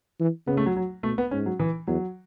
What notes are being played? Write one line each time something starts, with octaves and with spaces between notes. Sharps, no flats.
E3
C#3 B3
A3
F#3
F#3
B2 A3
B3
G#2 C#4
F#3
E3
E2 F#3